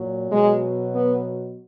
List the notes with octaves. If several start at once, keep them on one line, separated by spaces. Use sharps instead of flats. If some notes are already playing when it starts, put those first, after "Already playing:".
Already playing: A#2 F#3
B2 F#3 G#3
B3